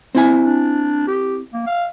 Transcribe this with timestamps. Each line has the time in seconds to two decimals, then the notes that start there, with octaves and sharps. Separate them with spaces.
0.15 C4 E4 G#5
0.43 D4
1.07 G4
1.54 A#3
1.67 F5